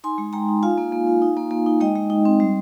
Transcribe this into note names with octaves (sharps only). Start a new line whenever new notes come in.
D#4 G#5 C6
G#3
G#3 G5 A#5
D#4
F4 F5 G#5
A#3
A#3
F4
D#4
A#3
A#3
D#4
G#3 D#5 G5
G#3
D#4
C4
G3